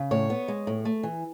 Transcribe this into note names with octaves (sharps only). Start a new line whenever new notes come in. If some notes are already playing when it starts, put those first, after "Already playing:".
Already playing: C#3
A2 C#5
B3
G#3
A2
A3
E3